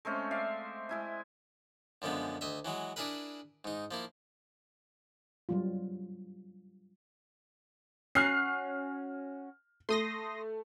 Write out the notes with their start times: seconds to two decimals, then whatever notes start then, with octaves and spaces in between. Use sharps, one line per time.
0.05 G#3 A3 C4 C#4
0.31 D5 E5 F5
0.89 G#3 E4 G#5
2.02 F#2 D3 F3 G#3 B3
2.41 D2 D#5 E5
2.65 E3 F#3 G#3 F#4
2.96 D4 E4 G#4 A#4 B4
3.64 G#2 D#4
3.91 F3 A#3 E4
5.49 F#3 G3 F4
8.15 C#4 F#4 F6 F#6 C7
9.89 A3 C6 D#6 A#6